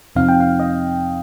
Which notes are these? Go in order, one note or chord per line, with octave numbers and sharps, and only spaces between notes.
F2 C3 F3 C4 D#4 F5
G5
F5
D#5